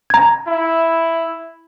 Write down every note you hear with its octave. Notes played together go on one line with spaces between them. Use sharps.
A#5 G#6
E4